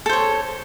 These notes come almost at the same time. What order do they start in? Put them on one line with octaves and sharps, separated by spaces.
A4 C5 C#5